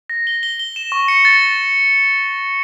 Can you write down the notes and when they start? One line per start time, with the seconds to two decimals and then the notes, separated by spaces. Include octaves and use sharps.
0.10 A#6
0.27 G7
0.43 G7
0.60 G7
0.76 E7
0.92 C#6
1.08 C#7
1.25 A6
1.42 A6